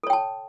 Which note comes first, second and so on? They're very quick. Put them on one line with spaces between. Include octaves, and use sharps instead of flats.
A4 C#5 G5 A5